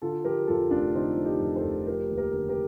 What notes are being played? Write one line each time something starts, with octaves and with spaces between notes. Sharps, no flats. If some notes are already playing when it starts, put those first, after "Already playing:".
D3 F4 A4
F3 G4 A#4
F2 F4 A4
F1 D4 F4
D3 C4 D#4
F3
D#4 G4
F2
A4 C5
F1
F3 G4 A#4
D#2
G4 A#4
D3
G4 A#4